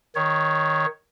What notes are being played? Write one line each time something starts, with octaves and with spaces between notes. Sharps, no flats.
D#3 C#5